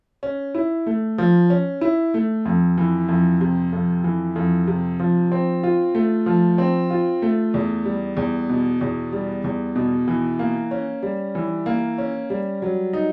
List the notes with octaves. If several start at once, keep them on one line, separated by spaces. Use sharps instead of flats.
C#4
E4
A3
F3
C#4
E4
A3
F2
E3
F2
C3
F2
E3
F2
C3
F3
C4
F4
A3
F3
C4
F4
A3
E2
G3
E2
B2
E2
G3
E2
B2
E3
A#3
C#4
G3
E3
A#3
C#4
G3
F#3
D#4